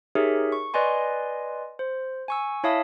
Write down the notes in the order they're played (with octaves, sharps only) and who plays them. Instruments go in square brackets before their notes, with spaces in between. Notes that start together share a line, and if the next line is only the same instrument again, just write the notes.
[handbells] D#4 G4 G#4 A#4 C#5 E5
C#6
B4 D5 D#5 G#5 C6
C5
G#5 C#6 E6
E4 C#5 E5 F5 A5 D#6